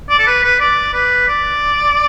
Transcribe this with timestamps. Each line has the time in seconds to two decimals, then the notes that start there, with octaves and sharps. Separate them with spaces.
0.09 D5
0.19 A4
0.27 B4
0.43 B4
0.60 D5
0.94 B4
1.28 D5